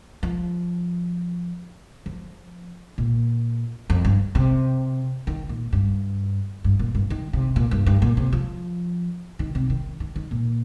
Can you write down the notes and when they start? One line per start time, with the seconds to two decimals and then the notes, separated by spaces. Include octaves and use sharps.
0.23 F3
2.06 F3
2.98 A#2
3.90 F2
4.05 G2
4.35 C3
5.27 D#3
5.49 A#2
5.72 G2
6.64 G2
6.79 A#2
6.95 G2
7.10 D#3
7.33 C3
7.56 A#2
7.71 G2
7.86 G2
8.02 A#2
8.17 C3
8.33 F3
9.39 D#3
9.55 C3
9.70 D#3
10.00 D#3
10.16 D#3
10.31 A#2